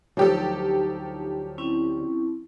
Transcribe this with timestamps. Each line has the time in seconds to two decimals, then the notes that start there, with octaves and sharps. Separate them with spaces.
0.17 D2 F3 F#3 D4 D#4 G4 A4
1.58 C4 C#4 E4